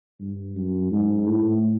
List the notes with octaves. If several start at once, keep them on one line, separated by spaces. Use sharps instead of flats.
G2
F#2
G#2
A2